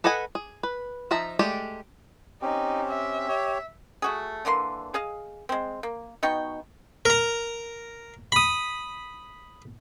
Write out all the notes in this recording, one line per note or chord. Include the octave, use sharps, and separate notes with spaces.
A4 B4 D#5 F#5 G#5
G#4
B4
F3 D#4 E5 A5 A#5
G#3 A3 G4 D5
C4 C#4 D#4 G4
E5
G4 C#5
A3 F#4 G#4
D3 E3 A#3 C6
G#4 D#5 F5
G#3 C4
A#3
B2 D#4 G5 C#6
A#4 A#5
B5 D#6